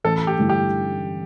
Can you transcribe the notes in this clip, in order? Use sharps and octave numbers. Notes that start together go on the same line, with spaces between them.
A1 A4
G4
G2 D3 A3 E4
G4